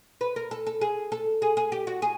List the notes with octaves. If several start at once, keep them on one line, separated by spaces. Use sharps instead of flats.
B4
A#4
A4
A4
G#4
A4
G#4
G#4
G4
F#4
G#4